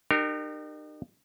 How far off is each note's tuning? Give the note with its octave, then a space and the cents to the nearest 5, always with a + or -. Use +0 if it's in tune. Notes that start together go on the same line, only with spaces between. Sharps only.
D#4 -45 G4 +0 A#4 -20